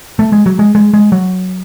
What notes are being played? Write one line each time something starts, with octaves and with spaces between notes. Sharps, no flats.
A3
G#3
F#3
G#3
G#3
G#3
F#3